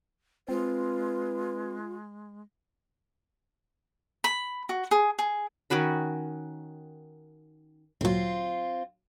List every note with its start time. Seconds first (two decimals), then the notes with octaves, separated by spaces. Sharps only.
0.49 G#3 C4 F4 B4
4.24 B5
4.69 F#4
4.91 G#4
5.19 G#4
5.70 D#3 C#4 F#4 B5
8.01 D2 A#2 F#3 C4 F4